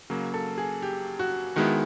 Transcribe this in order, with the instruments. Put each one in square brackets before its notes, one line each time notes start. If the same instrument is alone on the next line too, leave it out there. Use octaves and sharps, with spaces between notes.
[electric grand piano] C#3 F#3 A#3
[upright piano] A4
G#4
G4
F#4
[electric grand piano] D#3 G#3 B3 E4 [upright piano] F#4